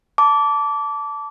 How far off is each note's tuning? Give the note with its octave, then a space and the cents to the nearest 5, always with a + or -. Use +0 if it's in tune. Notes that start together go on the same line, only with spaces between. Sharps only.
A5 +0 D6 -25